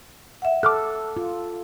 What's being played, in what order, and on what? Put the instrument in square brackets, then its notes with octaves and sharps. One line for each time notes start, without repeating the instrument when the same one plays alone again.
[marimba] E5 F#5
[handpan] A4 [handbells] D6 F6 F#6
[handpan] F4